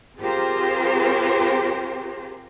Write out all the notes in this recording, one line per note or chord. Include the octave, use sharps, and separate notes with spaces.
C4 F4 G4 G#4 A#4 C5